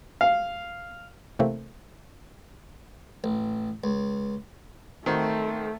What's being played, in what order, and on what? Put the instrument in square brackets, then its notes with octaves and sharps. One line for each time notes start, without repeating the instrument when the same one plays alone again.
[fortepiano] F5
[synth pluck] C3 E3 A3 A#3 C4
[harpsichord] A1
C#2
[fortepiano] D#3 C4 F#4 [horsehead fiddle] A3